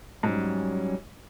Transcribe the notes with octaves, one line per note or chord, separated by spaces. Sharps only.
G#2 F#3 G3 C#4